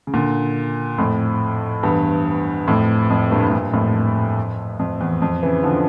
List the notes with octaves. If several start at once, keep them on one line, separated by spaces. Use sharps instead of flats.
C#3
A#2 D3
F2 A2
E2 G2
F2 A2
F2
G2 A#2
A2
G2 A#2
F2 A2
F2
F2
E2
F2
C#3 E3
D3 F3